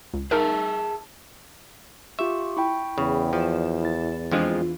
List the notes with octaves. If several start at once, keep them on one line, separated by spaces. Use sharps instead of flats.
C#2
D#4 G#4 A#4 E5 A5
F4 G4 E5 C#6
E4 G5 B5 C#6
E2 C#3
F3 D5 E7
E4 A6
F2 E3 F3 G#3 D4 F4